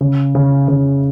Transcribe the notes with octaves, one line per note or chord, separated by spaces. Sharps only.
C#3
C#3
C#3